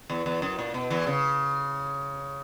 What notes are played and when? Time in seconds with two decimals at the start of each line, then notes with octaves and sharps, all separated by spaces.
0.10 E2
0.26 E2
0.42 F#2
0.59 A#2
0.74 B2
0.90 E2 E3
1.07 C#3